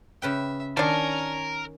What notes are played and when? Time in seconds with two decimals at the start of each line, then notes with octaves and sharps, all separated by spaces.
0.22 C#3 B4 E5 G5
0.77 D#3 C#4 D4 A#4 A5